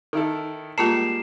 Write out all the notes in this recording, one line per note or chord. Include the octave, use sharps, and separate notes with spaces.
D#3 E4 A4
G3 G#3 A#3 F4 A#4 A5 C7 E7